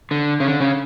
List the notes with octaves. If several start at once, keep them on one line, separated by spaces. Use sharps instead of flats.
D3
C#3
D3
C#3